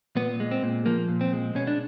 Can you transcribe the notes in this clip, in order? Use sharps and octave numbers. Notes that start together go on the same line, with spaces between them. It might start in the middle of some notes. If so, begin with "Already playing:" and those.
A#2 B3
G#3
C4
A#2
F3 A#3
A#2
C4
G#3
B2 C#4
D4